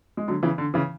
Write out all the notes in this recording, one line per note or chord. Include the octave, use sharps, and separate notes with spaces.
G#3
D3 F#3
C#3 E3
D3
C#3 E3